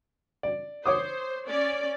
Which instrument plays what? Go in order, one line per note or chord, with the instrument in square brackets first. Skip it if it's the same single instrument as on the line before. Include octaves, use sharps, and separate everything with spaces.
[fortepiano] D5
[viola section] C5 [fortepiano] C#5 D6 D#6
[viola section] C#4 D5